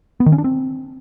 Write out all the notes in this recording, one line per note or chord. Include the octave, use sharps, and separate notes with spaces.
B3
D#3
C#4
D4
C4